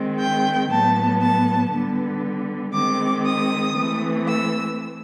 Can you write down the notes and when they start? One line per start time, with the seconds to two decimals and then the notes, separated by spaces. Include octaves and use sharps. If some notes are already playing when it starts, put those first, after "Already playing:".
Already playing: D#3 G#3 C4
0.19 G5
0.70 A2 F#3 B3 A5
1.21 A5
1.71 D3 G3 B3
2.74 D#3 G#3 C4 D6
3.25 D#6
3.77 E3 A3 C4
4.27 E6